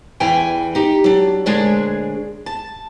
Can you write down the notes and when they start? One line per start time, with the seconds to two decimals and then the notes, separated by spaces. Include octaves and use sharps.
0.20 E2 E3 G5 G#5
0.75 D#4 G4
1.04 F#3 D4
1.46 D2 A#2 G#3 D4 G#4 C#5
2.46 A5